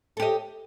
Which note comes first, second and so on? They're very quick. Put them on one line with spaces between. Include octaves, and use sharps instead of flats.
A4 G4 D#5